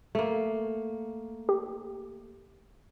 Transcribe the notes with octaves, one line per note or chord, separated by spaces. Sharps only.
A3 A#3
G4